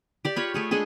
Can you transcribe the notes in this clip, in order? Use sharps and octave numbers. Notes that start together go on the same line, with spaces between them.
G4 D5
F4 C#5 B5
A3 G#4 C#5
G#3 D4 G#4 A4